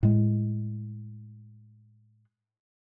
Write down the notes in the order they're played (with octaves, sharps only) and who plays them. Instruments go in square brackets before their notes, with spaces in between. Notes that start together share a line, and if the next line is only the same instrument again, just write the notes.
[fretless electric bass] A2 G#3